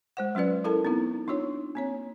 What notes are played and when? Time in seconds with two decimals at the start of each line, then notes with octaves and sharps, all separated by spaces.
0.17 G#3 C5 F#5
0.35 F#3 C#4 F4 B4 D5
0.64 E4 A4 A#4 A5
0.85 B3 C4 D#4 E4
1.28 D4 D#4 F4 C#5
1.75 A#3 C4 C#5